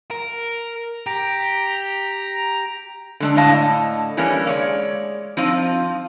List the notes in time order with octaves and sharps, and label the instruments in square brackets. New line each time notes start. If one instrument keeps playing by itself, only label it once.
[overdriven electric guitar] A#4
[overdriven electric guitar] G4 [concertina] A#5
[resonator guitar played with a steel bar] D3 G#3 D4
A2 D3 D#5 F5 A5
E3 G3 A#3 C#4 D4
G#3 C#5 D5 F5
F3 C4 D#4 F4